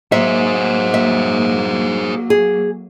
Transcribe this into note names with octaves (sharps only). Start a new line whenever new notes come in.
F#3 A#3 G#4 C5 E5
E5
G#4